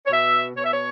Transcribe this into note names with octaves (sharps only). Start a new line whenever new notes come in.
C#5
B2 E5
B2 C#5
E5
C#5